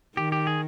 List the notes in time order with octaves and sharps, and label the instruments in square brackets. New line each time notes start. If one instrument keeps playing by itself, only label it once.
[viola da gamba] D#3 [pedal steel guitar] G4
[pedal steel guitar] G4
G#4